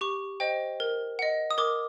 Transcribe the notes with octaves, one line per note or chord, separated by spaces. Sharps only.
G4 C#6
C5 D#5 G5
A#4
D#5 F#5
D#6
A#4 D6